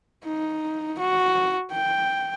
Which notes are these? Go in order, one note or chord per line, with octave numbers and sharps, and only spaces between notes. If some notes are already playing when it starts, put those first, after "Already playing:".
D#4
F#4
G5